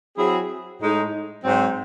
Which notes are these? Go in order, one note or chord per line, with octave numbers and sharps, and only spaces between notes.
F#3 C4 E4 G#4
A2 G#3 D#4
G#2 F#3 C4